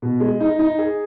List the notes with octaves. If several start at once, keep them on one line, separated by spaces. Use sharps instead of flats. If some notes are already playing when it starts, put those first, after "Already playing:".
B2
G#3
D#4
D#4
G#4